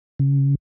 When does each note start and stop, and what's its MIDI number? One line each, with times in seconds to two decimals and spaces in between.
0.19 0.55 49